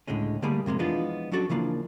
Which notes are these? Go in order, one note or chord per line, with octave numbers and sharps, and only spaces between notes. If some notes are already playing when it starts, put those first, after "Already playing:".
C#2 A2 D3 G#3 C#4
D3 G3 A3 A#3 G#4 B5
F2 C3 G#3 A#3
E3 F3 G#3 B3 D4 F4
F#3 C#4 D4 F#4 A4 D5
C#3 E3 F3 A#3 D4